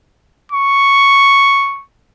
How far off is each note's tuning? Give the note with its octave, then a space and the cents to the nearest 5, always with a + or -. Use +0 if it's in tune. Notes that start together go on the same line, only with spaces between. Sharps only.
C#6 +0